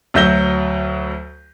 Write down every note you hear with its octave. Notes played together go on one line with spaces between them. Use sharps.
D2 F#3 E5 G6 A#6 G7